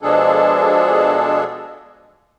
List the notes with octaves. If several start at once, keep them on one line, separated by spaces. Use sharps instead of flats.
B2 F3 G#3 D4 G#4 A4